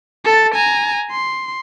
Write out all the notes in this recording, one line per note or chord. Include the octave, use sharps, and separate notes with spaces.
A4 A6
G#5 A#5
C6